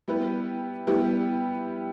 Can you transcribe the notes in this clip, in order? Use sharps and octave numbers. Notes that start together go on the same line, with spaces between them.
G3 B3 E4 G4 B4
G3 B3 E4 G4 B4